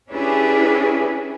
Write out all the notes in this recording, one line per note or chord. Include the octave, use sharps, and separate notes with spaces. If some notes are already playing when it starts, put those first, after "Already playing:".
C#4 D4 E4 G4 G#4 B4